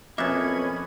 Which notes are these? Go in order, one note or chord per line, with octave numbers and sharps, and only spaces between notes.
B1 F2 A#3 B3 C#4 E5 B5 G#6